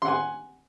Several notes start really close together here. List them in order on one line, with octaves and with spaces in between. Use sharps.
C6 F#5 G#5